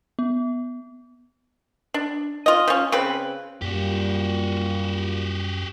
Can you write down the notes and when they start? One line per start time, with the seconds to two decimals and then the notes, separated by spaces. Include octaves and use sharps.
0.19 B3
1.94 D4
2.46 F4 D#5
2.68 F3 C#4
2.92 C#3 C4 B4
3.62 F#2 A#2 G3 F#4 G4